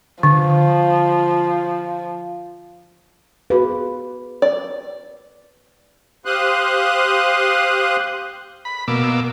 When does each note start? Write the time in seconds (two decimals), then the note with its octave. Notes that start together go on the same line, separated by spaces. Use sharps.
0.23 D3 F3
3.50 F#4 G#4 B4 F5
4.42 D5
6.25 G4 C5 F5 C6 D#6 F#6
8.65 B5
8.88 B2 A#3 D6 E6